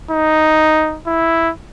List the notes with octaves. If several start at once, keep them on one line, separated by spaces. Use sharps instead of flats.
D#4
E4